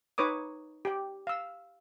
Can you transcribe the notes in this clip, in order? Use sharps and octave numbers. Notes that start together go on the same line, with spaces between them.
D#4 B4 C#5 D6 D#6
G4 G5
F5 E6